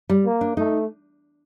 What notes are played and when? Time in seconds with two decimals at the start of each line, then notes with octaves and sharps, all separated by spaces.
0.10 G3
0.25 A#3
0.41 D4
0.57 A3 D#4